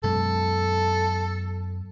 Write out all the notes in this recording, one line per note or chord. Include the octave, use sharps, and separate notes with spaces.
F#2 B2 G#3 A4